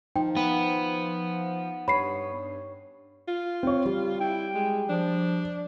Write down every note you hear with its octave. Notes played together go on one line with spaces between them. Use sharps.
F3 D#4 G5
B3
G2 C#5 B5 C7
F4
C4 C#5
G3
E4 G5
G#3
F3 D4